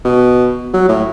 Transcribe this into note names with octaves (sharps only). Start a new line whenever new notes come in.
B2
F#3
A2